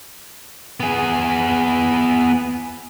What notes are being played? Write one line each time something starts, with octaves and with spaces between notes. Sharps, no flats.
B3 G#4